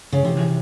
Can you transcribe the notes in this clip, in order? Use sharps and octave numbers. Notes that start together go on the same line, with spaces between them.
C#3
C3 E3
E3